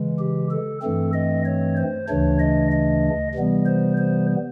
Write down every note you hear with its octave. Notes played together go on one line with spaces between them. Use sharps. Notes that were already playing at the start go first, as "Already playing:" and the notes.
Already playing: C#3 E3 G#3
G4
A4
G2 E3 A3 C4 A4
D#5
C#5
C5
D2 C#3 E3 A3 D4 C#5
D#5
D#5
C3 E3 G3 B3
C5
C5